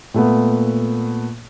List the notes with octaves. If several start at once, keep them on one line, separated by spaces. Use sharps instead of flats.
A#2 A3 B3